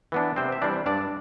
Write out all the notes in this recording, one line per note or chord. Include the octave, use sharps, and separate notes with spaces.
E3 B3 D4
C3 C4 C5
E5
E3 G3 C4 D4 D5
G2 D4 D5